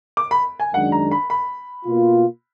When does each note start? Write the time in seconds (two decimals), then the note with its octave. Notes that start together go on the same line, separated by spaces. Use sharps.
0.17 D6
0.31 B5
0.60 G#5
0.73 F#2 D#3 G#3 D4 F#5
0.92 A#5
1.11 B5
1.30 B5
1.86 B2 A#3 F4